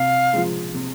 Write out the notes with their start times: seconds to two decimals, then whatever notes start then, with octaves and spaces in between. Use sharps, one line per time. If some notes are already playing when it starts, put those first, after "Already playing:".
Already playing: C3 F5
0.33 F3 G#3
0.74 C3